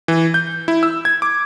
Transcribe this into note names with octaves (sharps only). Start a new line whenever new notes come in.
E3
G6
E4
E6
G#6
D6